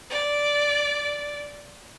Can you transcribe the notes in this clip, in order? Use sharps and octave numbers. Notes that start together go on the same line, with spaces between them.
D5